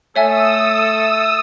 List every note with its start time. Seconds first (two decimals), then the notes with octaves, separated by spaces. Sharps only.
0.16 A3 A4 C#5 E5 G#5 D#6 E6